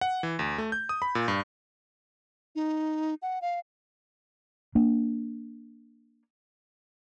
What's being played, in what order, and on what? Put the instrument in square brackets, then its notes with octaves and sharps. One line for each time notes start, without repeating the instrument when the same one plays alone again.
[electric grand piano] F#5
E3
D2
A3
G6
D#6
B5
A#2
G2
[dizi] D#4
F#5
F5
[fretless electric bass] A#3 D4